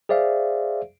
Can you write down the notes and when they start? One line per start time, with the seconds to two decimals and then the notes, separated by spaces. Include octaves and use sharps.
0.09 G#4 C5 D5 E5 F5